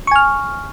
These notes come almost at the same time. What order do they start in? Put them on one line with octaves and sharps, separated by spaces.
C#6 G#5 F6